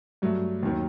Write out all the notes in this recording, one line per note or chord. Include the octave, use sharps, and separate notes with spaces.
G2 F#3 A3
D#2 D#3 F#3